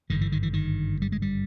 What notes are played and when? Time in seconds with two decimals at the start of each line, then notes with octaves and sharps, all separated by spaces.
0.10 G#1 G2 D3 D#3
0.21 E3
0.32 D#3
0.43 E3
0.53 D#3
1.02 G3
1.12 G#3
1.22 G3